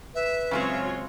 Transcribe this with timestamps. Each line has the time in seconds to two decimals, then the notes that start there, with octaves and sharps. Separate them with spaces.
0.15 B4 E5
0.51 C#3 F#3 G#3 C4 F4 C#5